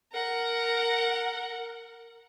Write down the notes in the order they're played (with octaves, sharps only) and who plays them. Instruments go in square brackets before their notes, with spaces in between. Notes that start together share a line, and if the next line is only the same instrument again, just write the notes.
[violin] A#4 F#5